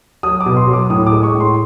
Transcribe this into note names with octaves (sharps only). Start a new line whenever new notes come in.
F#3 D#6
D6
B2
C6
F#3
D6
A2 D#6
D6
G#3
C#6
A2
C6